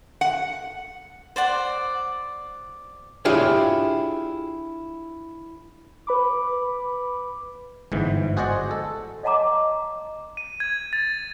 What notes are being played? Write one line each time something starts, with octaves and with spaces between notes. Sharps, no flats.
F#5
C5 D5 F#5
D4 E4 F4 G4 G#4 C#5
B4 B5 D6
G1 G#2 E3
F#4 G#4 C5 D5 D#5 F#5
A4
C#5 D#5 F5 A5 A#5 D6
D#7
G#6
A6